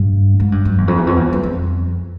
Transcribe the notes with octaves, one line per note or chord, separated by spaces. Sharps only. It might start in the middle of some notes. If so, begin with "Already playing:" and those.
Already playing: G2
G#2
G2
F#2
E2
F2
E2
F2
E2
F#2
F2